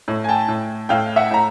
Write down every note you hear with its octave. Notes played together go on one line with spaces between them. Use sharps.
A2
G#5
G5 A5
A2
A2 F5 G5
E5 F#5
A2 A#5